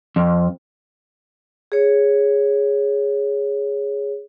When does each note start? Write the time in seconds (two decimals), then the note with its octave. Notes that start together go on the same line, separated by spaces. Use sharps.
0.16 F2
1.72 G#4 C#5